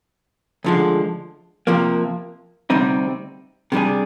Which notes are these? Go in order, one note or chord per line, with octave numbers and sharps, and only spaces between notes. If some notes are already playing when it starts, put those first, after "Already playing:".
D2 D3 F3 G#3
C3 F3 A#3
D2 C3 G3 C4 D#4
C3 G3 D4 G#4